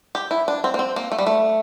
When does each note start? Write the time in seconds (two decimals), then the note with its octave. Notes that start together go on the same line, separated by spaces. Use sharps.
0.15 G4
0.31 E4
0.48 D4
0.64 C4
0.74 A#3
0.79 C4
0.96 A#3
1.12 A3
1.18 G3
1.27 A3